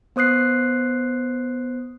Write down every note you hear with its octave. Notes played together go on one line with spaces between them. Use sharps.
B3 C5 D#6 F#6 C7